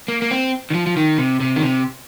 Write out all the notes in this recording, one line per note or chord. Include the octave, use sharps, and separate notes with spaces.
A#3
A#3
C4
D#3
F3
F3
D#3
C3
C3
D#3
C3